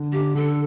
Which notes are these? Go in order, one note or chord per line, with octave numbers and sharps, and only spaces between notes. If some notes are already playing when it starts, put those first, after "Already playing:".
Already playing: D3
D3 G4
D3 A4